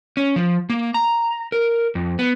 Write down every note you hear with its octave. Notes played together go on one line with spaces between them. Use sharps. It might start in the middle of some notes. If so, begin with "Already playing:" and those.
C#4
F3
A#3
A#5
A#4
F2
B3